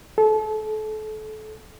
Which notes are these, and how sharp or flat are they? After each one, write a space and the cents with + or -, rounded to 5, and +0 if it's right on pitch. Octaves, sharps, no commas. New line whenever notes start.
A4 -30